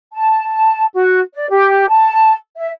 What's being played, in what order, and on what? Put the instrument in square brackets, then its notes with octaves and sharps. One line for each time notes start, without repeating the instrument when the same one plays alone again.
[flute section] A5
F#4
D5
G4
A5
E5